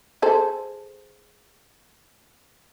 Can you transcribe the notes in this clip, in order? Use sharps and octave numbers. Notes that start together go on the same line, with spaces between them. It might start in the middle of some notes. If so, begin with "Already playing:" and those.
G#4 A4 C5